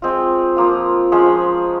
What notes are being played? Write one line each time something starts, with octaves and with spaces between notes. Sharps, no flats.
G#3 C4 F4
F3 A#3 F4
F3 G#3 C#4 G#4